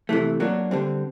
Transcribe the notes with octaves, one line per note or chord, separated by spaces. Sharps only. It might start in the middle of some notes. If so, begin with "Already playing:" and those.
C3 E3 A3
F#3 A#3 D4
D3 G3 C4